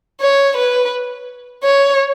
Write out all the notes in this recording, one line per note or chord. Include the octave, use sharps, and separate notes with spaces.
C#5
B4
C#5